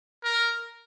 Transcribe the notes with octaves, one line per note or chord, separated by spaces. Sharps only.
A#4